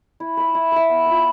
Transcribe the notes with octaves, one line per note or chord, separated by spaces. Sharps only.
E4
B4 E5
E4
B4 E5
B3
F4 B4